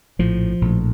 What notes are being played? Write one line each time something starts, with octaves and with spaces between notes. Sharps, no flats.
A#1 A2 F3
A#1 A2